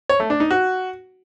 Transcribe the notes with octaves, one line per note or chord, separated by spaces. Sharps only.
C#5
A3
D4
D#4
F#4